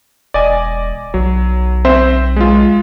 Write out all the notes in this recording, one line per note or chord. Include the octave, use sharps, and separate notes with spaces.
E1 D5 D#5 G#5
B1 F#3
C4 C5 E5
G#3 F4